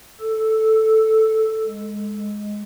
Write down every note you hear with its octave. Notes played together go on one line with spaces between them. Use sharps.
A4
G#3